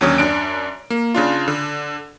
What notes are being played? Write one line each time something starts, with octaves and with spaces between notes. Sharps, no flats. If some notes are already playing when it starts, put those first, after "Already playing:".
D#2 D3 F#3 C#4 D#6
F#2 D4 D7
A#3
C#3 D4 F4
D3